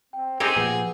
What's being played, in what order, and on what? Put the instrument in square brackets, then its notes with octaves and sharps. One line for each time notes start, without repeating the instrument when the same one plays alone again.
[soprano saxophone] C4 [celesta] G5
[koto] C4 D#4 G4 [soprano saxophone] G#4 [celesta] G#6 C7 D#7
[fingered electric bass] A#2 F3 [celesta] B4 F#5